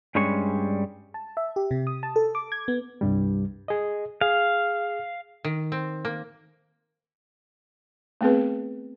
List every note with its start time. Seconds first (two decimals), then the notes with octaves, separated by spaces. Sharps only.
0.15 G2 G3 G#3 C#4 C#5
1.14 A5
1.37 E5
1.56 G4
1.71 C3
1.87 D#6
2.03 A5
2.16 A4
2.35 D6
2.52 G#6
2.68 B3
3.01 C2 G2 G3
3.68 G#4 D#5
4.21 G#4 F5
5.45 D#3
5.72 C4
6.05 A#3
8.21 A3 B3 C4 G#4 B4